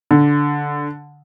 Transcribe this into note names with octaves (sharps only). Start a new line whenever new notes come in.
D3